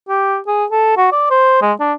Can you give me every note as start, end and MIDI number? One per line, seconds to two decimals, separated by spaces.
0.09 0.38 67
0.47 0.65 68
0.71 0.95 69
0.97 1.07 66
1.12 1.29 74
1.31 1.61 72
1.62 1.73 56
1.80 1.93 62